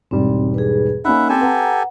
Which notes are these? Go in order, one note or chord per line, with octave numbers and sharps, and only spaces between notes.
E1 G#2 G3 C4
G#4 B4
A#3 C#4 D#4 E5 F#5 B5
C4 G4 A4 G#5
B4 F#5 A#5